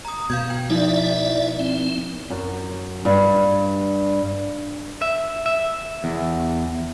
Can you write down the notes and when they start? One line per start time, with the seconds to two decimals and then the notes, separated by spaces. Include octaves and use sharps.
0.05 A#5 D#6
0.30 B2 F5 G6 G#6
0.50 G5
0.70 F3 D#4 E4 D5 E5
1.59 C4
2.30 F#2
3.05 G2
5.02 E5
5.46 E5
6.04 E2